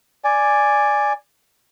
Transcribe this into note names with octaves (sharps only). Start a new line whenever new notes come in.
D5 G#5